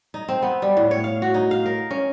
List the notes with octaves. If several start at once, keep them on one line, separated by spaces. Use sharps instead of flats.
D#4
C4
B3
G3
A2
C#5
F5
F#4
D#4
F5
A#4
C#4